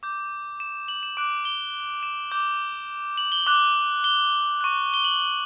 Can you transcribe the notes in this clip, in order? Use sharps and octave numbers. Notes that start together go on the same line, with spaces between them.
D6 G6
E7
F#7
E7
D6 F#6 D7
G7
E7
D6 G6
F#7
G7
D6 F#6
G7
C#6 F#6
G7
F#7